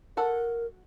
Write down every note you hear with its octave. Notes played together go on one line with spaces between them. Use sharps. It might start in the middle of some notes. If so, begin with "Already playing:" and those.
F#4 A4 A#4 F#5